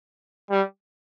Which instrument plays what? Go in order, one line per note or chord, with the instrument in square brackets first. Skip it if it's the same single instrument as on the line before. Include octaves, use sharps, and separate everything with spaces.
[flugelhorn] G3